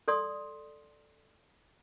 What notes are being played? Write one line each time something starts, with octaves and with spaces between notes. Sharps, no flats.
A4 D5 C6 D#6